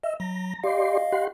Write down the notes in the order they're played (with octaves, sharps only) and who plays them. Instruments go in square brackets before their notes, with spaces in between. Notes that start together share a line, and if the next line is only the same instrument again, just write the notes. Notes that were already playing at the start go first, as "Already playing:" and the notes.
[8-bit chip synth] D#5 [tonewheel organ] E5
[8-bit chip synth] F#3 [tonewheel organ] A#5
[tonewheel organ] G4 D5 C6 [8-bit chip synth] D#5 F5
[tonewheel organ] G4 F#5 C6